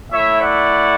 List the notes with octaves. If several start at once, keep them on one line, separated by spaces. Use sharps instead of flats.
A3 E4 C#5 E5
D5 F#5